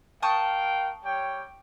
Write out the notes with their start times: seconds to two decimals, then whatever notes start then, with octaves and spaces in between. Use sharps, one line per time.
0.23 A#4 F5 G5 A5 C#6 D#6
1.04 G3 C#5 G5